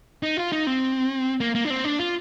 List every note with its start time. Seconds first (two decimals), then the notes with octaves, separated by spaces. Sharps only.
0.23 D#4
0.37 F4
0.52 D#4
0.67 C4
1.40 A#3
1.55 A#3
1.65 D4
1.70 C4
1.84 D4
1.99 F4